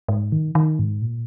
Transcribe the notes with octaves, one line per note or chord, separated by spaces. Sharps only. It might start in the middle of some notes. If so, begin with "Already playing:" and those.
G#2
D#3
D#3
G#2
A#2